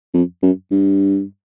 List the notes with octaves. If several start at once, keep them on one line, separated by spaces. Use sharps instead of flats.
F2
F#2
G2